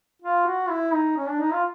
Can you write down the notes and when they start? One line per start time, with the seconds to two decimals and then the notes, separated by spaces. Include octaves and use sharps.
0.22 F4
0.46 F#4
0.69 E4
0.93 D#4
1.17 C#4
1.29 D4
1.40 D#4
1.52 F4